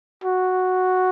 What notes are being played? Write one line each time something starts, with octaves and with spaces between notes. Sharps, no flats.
F#4